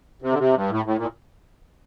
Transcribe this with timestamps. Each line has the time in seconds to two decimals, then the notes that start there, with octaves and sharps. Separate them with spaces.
0.22 C3
0.32 D3
0.38 C3
0.54 G2
0.70 A2
0.85 A2
0.96 A#2
1.02 A2